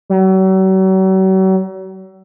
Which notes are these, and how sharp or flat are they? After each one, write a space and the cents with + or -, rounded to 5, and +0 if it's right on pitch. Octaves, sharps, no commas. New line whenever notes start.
F#3 +40